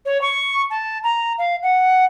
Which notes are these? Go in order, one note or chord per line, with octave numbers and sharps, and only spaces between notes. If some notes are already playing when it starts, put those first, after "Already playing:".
C#5
C#6
A5
A#5
F5
F#5